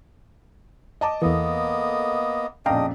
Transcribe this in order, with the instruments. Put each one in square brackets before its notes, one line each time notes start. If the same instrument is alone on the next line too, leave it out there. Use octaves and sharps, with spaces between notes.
[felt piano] D#5 A5 D6
[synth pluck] E2 E3 [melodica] A#3 B3 D#5 [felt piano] A4
[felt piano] A#1 F2 C#3 [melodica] D4 D#5 [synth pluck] F5 G5 A#5